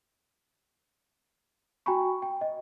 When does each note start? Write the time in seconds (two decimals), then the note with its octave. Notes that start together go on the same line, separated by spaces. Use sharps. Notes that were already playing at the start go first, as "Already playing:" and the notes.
1.86 F#4 G5 G#5 A#5 B5 C#6
2.22 G5
2.41 D#5